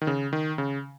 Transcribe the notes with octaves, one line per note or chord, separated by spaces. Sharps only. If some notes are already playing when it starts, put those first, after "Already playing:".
D#3
C#3
D#3
C#3